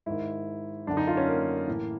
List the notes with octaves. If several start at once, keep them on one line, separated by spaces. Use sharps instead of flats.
G#2 D#3 E4
F#2 D3 D4
D#4
F4
C#4
A#3
A2 E3